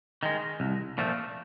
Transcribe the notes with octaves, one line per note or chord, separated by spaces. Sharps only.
D#3 G#3
C2
A#2 F3 A3